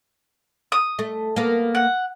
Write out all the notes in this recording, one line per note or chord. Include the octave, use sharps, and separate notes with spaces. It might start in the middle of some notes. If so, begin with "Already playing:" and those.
D#6
A3
A#3 B3
F#5